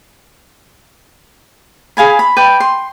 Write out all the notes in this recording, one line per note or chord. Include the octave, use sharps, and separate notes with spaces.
G#4 F5 G#5 B5
B5
B4 D5 G5
C6